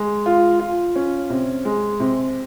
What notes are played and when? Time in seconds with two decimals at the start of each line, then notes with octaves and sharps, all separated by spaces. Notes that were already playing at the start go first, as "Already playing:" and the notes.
Already playing: G#3
0.26 F4
0.60 F4
0.96 C#4
1.30 C3
1.65 G#3
2.00 C3